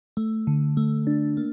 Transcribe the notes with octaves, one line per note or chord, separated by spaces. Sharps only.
A3
D3
A3
D4
A#3